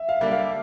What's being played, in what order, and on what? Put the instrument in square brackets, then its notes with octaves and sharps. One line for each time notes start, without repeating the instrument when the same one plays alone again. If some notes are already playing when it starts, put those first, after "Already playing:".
Already playing: [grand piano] E5
F5
[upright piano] D3 G3 A#3 D4
[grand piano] F5